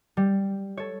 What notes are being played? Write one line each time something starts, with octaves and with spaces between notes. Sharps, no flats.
G3
A4 C#5